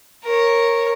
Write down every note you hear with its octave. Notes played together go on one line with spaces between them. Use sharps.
A#4 C#5